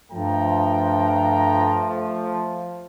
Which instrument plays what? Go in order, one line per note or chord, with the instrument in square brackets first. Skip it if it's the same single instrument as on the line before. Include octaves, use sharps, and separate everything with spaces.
[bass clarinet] G2 [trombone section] F3 A3 [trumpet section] G5 A5 A#5